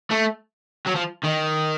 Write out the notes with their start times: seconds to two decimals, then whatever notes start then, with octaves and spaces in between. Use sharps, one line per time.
0.11 A3
0.86 F#3
0.95 F3
1.23 D#3